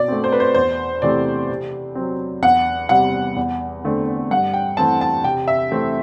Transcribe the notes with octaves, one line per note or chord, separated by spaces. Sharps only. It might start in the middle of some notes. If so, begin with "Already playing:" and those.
Already playing: B2 D5
A3 C4
C5
B4
C5
E2 C5
C3 E3 A3 C4 D5
C3
F#3 C4
E2 F#5
C3 G3 C4 F#5
E2
D3 A3 C4
G2 F#5
G5
E3 A3 C4 A5
A5
C3 G5
E5
E3 A3 C4